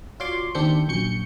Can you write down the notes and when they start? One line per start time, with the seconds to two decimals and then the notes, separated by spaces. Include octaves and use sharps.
0.20 F4 F#4 C#5 D5 C6 D6
0.55 D#2 C4 D4 E5 G6 C#7
0.88 A#1 F#2 C#6 G6 C#7